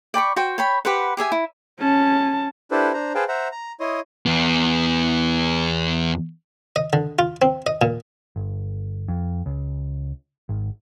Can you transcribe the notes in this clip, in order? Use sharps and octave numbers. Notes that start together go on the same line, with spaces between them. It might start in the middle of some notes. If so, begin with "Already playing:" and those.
D5 G5 B5 C#6
F#4 C5 G5
C#5 G5 B5
G4 B4 C5 F#5
G4 G#4 E5 G#5
E4
C#4 A5
D4 E4 G4 A4 B4 C5
D4 C5 A#5
G#4 B4 C5 F5 G5 A5
C5 E5 F#5 A#5
A#5
E4 C#5 D#5 C6 D#6
E2 B3
D#5
D3
F4
C4
D#5
A#2
G1
F2
C#2
G#1